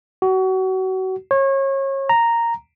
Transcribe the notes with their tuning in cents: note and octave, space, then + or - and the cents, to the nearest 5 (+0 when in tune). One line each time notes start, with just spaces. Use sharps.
F#4 +30
C#5 -30
A#5 -5